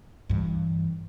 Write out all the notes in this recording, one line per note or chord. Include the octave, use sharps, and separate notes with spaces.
G2 E3